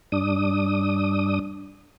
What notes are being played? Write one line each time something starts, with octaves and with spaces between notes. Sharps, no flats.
G2 D4 D#6